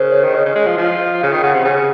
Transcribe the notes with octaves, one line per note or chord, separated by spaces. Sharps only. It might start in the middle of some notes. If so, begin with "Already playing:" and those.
Already playing: C#3 A#4 C5
C#5
D#3
C#3 D#5
C#3
G#3
F3
F3
C#3 F5
D#3
C#3 F#5
C3
C#3